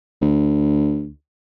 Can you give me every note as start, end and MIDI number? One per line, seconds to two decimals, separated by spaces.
0.22 1.10 38